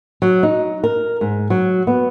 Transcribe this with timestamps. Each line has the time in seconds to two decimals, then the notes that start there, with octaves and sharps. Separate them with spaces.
0.22 F#3
0.43 D#4
0.84 A#4
1.21 G#2
1.50 F#3
1.87 B3